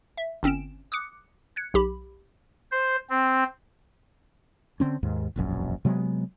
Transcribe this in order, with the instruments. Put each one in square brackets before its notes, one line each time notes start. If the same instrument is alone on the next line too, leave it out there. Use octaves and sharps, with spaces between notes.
[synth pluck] E5
G1 C4 C#4 D7 E7
D6 D#6 F#6 C#7
F#6 G#6 C#7
B1 G4 B5
[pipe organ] C5
C4
[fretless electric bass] D3 C4 C#4
D#2 G#2
E1 A#1 F#2
C3 F#3 G#3 B3